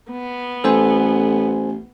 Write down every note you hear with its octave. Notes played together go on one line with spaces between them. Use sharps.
B3
A1 A4 C5 G#5